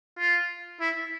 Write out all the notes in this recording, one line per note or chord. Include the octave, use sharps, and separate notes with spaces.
F4
E4